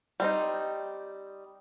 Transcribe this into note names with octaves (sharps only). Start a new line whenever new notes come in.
G3 C4 D#4